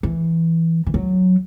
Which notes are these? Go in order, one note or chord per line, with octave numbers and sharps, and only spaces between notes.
E3
E3
F#3